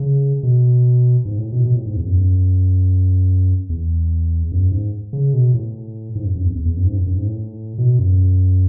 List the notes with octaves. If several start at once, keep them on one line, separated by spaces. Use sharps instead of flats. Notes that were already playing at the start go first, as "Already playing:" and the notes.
Already playing: C#3
B2
G#2
A2
B2
B2
A2
G#2
E2
F#2
E2
F#2
G#2
C#3
B2
A2
G#2
F#2
F#2
E2
E2
E2
F#2
G#2
F#2
F#2
G#2
A2
B2
F#2